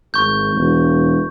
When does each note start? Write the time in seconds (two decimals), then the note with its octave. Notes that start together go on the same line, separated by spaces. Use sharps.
0.14 G#1 C#6 G6
0.55 E1